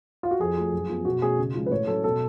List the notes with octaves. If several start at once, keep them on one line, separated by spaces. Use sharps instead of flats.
F4
F#4
F2 G#4
F3 A3
F#2
F3 B3
B2 F#4
A3 C#4 G#4
C#3
F3 G#3
B4
A2 C#5
F#3 A3 C#4 A4
B2 A4